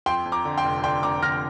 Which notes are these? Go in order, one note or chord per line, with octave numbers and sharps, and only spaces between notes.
F2 G5 C6
F2
A#5 D6
D3
G5 C6
F1
D3 G5 C6
F1 A#5 D6
D3 F6 A#6